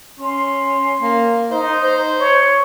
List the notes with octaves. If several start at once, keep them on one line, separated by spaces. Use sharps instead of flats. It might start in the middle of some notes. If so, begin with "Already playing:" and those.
C#4 C6
A#3
D#4 C5
C5
C#5